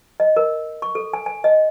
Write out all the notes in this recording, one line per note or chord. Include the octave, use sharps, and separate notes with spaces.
D#5
A#4
C#6
A4
G#5
G#5
D#5